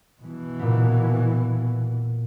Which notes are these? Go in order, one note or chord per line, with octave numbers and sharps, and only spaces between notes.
B2 E3
A#2 B3